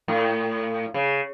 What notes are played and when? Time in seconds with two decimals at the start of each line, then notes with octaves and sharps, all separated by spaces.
0.08 A2
0.94 C#3